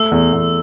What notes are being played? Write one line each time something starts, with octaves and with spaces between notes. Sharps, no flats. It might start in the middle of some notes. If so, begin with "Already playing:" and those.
Already playing: A3 E6
E2
E2